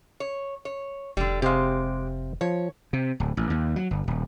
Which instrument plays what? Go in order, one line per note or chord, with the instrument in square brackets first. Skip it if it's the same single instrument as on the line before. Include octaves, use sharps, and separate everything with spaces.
[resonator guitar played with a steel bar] C#5
C#5
[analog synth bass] F1 [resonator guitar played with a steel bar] D3 G3
[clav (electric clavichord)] C3 C5 F5 [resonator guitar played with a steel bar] G#3 G4
[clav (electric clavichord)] F3 [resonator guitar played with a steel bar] C#5
[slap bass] C3
D1
A1
D#2
F#3
G1
D#1